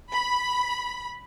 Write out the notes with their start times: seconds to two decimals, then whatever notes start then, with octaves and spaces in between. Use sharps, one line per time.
0.12 B5